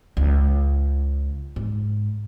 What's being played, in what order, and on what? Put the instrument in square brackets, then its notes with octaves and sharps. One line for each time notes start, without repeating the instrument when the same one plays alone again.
[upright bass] C#2
G#2